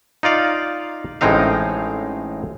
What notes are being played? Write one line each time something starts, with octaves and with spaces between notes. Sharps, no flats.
D#4 F4 D5 F5
A1 A2 G#3 C4 D#4 F5